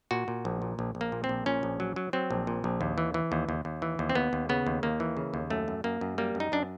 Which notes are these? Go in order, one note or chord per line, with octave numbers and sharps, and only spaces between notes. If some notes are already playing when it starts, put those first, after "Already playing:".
A#2 F#4
A#2
A#1
A#2
A#1
A#1
A#3
A#2
C4
A#1
A#2 C#4
A#1
F#3
F#3
F#3 C4
A#1
A#2
A#1
D#2
E3
E3
D#2
D#2
D#2
E3
D#2
C4
D#2 B3
D#2
C#3 B3
D#2
D#2 A#3
E3
C#3
D#2
F#2 A3
F#2
F#2 A#3
F#2
G3 A#3
F#2
D#4
F#2 D4